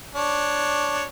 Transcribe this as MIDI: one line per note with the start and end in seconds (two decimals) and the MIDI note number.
0.15 1.05 62
0.15 1.05 73